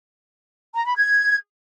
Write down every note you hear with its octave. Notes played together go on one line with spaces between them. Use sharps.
A#5
B5
G#6